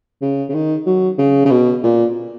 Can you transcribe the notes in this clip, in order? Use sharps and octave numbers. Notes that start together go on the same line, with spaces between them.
C#3
C#3
D#3
F#3
C#3
C#3
B2
A#2